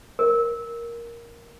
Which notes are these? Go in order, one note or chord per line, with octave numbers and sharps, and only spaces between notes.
A#4